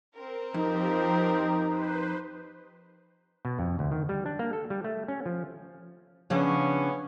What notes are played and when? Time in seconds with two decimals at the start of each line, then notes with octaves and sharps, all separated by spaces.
0.16 C4 A#4
0.54 F2 F3 D#4 G4
1.67 B4 C5
3.45 B2
3.59 F2
3.79 D2
3.91 D#3
4.09 G3
4.26 D4
4.39 A#3
4.53 A4
4.70 G3
4.84 A3
5.08 C#4
5.26 F3
6.30 C#3 F3 B3 C#4 D4